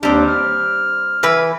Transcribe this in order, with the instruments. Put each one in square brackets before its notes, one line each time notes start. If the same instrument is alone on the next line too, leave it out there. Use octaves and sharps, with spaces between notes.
[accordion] D#2 D4 [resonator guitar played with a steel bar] G3 C4
[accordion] F6
[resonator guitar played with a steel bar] E3 B4